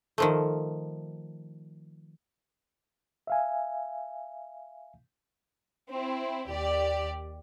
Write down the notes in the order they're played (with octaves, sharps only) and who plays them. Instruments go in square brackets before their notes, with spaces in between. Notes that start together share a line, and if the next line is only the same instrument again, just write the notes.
[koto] D#3 F3 A3
[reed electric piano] E5 F5 G#5
[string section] C4 E4
D#2 G4 D5